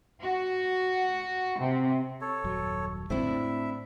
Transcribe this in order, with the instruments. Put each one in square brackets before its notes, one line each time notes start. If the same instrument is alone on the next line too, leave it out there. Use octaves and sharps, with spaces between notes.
[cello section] F#4
C3
[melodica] A4 C#5
[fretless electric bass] D#1 F#2 F#3
[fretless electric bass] A1 F2 D3 [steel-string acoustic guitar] C4 D4 E4 [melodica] E5
[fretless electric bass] A2